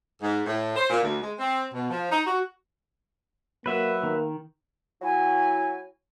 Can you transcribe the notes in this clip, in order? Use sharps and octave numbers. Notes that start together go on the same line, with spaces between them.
G#2
A2
C5
A#2
D2
G#3
C4
B2
F3
D#4
F#4
F#3 A#3 B4 E5
D#3 A#3
F#3 E4 G#5